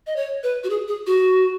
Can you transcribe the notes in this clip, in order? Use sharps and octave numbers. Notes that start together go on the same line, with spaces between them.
D#5
C#5
B4
F#4
G#4
G#4
F#4